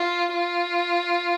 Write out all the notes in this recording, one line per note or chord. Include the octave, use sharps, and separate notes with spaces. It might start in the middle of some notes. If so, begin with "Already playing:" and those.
Already playing: F4
F4